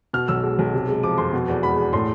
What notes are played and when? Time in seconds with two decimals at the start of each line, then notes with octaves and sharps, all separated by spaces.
0.13 B2 F6
0.28 B1 E6
0.43 G#3
0.59 B1
0.74 C3
0.88 G#3
1.03 F3 D6
1.18 F2 C6
1.33 B2
1.48 E2
1.63 G#3 B5
1.78 E2
1.93 A2 C6